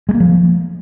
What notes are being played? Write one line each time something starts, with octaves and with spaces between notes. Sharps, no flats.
G#3
A#3
F3